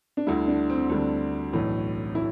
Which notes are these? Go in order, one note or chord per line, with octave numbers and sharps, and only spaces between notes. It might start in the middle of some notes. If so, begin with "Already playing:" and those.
D4
D2 D3 G3 E4
D4
C4
D2 D3 G3 D4
B1 A2 E3
A2 E4